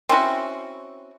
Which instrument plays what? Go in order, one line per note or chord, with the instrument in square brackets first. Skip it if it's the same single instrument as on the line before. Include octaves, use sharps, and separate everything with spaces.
[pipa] C4 C#4 E4 F#4